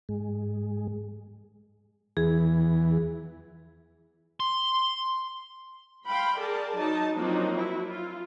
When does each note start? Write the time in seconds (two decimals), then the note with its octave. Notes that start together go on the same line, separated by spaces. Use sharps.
0.09 G#2 G#3
2.17 E2 E3 G#4
4.40 C6
6.06 F5 G5 B5 C6
6.37 G#4 A#4 D5 A5
6.75 F#3 D#4 A5
7.16 F3 F#3 A#3 C4 D4 D#4
7.55 E4 F#4
7.86 F4